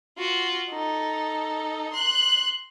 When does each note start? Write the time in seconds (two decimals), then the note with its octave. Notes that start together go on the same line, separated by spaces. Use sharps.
0.18 F4 F#4
0.71 D#4 A4
1.93 C6 F#6